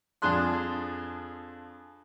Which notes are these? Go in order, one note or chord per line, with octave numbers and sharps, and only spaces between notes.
F2 D4 G#4 C6 F#6